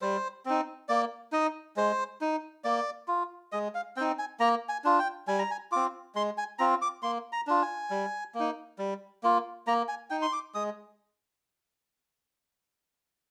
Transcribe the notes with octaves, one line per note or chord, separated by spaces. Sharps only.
G3 C5
C4 D#4
A#3 D5
D#4 D#5
G#3 C5
D#4
A#3 D5
F4
G#3 D#5
F5
C4 D#4 G5
G#5
A#3 A#5
G#5
D4 F4
G5
G3 G#5
A#5
G#5
C4 F4 D6
G#3 C6
G#5
C4 F4 A#5
D6
A#3 C6
A#5
D4 F4
G#5
G3
A#3
D#4
G3
A#3 F4
A#3 A#5
G#5
D#4 G5
C6
D6
G#3 D#6